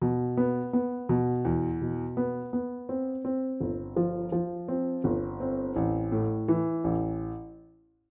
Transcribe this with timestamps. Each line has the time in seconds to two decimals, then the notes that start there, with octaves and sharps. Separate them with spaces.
0.02 B2
0.37 B3
0.73 B3
1.09 B2
1.45 E2
1.82 B2
2.17 B3
2.53 B3
2.89 C4
3.25 C4
3.61 G1
3.96 F3
4.32 F3
4.68 C4
5.04 G1
5.40 C4
5.76 A1
6.12 A2
6.48 E3
6.84 A1